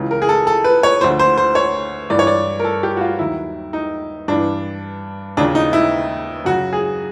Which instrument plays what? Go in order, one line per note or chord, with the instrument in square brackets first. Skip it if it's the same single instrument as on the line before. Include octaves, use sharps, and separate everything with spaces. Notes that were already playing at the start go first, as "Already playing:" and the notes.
Already playing: [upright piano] C#2 C#3 E3
A#4
G#4
A4
A4
B4
C#5
D2 D3 F3 C5
C5
C5
C#5
G2 E3 D5
C#5
D5
A#4
A4
G4
F#4
F4
D#2 D#3 F#3 E4
D#4
G2 E3 D4
D#2 C#3 F3 D4
D#4
E4
F#2 C#3 F#3 F#4
G#4